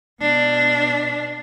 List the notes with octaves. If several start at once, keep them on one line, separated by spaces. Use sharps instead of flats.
B2 D4